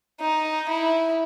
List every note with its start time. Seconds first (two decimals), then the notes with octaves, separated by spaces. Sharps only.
0.21 D#4
0.69 E4